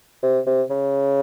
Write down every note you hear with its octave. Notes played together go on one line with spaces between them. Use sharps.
C3
C3
C#3